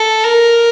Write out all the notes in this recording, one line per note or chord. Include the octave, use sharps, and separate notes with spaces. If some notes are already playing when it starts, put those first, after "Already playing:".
Already playing: A4
A#4